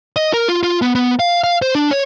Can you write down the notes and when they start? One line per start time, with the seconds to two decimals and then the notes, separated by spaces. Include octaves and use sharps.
0.16 D#5
0.34 A#4
0.48 F4
0.63 F4
0.82 B3
0.95 B3
1.19 F5
1.44 F5
1.62 C5
1.75 D4
1.91 C#5